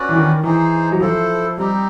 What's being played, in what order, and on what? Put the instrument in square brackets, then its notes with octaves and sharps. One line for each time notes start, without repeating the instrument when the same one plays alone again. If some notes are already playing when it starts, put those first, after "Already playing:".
Already playing: [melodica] C#4 F#4 B4 D5
[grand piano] E3
D#3
[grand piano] E3 [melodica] D#4 G#4 C5
[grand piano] F#3
[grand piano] F3 [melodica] E4 A4 C5
[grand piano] G3 [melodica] C4 D#4 G4